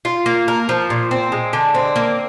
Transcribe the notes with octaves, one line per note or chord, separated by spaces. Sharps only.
F4
A#3
A#4
F3
A#2
C4
G#3
D3
C4
A#3